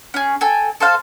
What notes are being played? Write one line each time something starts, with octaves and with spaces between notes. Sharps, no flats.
C#4 G#4
A4 G5 G#5
A4 C5 F5